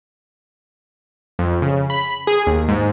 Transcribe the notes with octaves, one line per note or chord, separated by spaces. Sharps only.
F2
C#3
B5
G#4
D#2
G#2